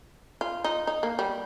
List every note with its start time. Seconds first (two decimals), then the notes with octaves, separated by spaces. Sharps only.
0.41 F4
0.64 D#4
0.87 D#4
1.03 A#3
1.19 G3